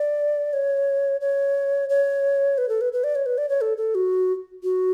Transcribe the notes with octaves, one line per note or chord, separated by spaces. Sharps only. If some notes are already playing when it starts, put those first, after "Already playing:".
Already playing: D5
C#5
C#5
C#5
B4
A4
B4
B4
D5
C#5
B4
D5
C#5
A4
A4
F#4
F#4